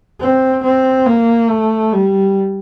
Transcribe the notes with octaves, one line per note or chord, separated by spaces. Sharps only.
C4
C4
A#3
A3
G3